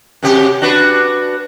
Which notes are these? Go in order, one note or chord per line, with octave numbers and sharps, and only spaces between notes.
F#2 C3 G4
D4 F#4 B4